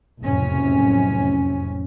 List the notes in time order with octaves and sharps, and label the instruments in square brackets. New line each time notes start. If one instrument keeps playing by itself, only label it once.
[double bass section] F#1 B1 F2 A2 C3 C#4